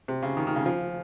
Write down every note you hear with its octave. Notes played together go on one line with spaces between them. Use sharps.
C3
C#3
D#3
D#3
C#3
F3